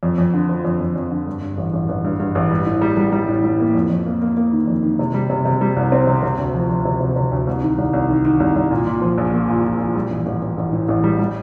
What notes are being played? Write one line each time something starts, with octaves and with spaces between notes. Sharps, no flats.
F2
F2
D3
F3
F2
F2
F2
D3
G2
G2
A1
A1
A1
G2
G2
A1
G3
A2
G3
G3
G3
A2
A2
A#3
F2
F2
A#3
A#3
A#3
D#3
F2
D#3
C3
G3
C3
C3
G3
C2
C4
C3
C3
D2
F3
F3
C3
C3
C3
D2
C2
D#3
C2
C2
D#3
D#3
C2
C2
A#2
A#2
F3
A#1
A#3
A#2
A#2
A#2
G3
A1
A1
A1
A1
A2
A1
G3
G3